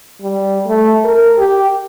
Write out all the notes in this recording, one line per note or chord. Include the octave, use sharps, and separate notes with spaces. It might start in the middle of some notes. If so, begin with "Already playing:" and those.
G3
A3
A#4
G4